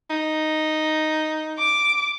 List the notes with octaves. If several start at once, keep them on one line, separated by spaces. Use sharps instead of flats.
D#4
D6